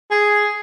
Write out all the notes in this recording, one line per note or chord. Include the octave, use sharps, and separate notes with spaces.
G#4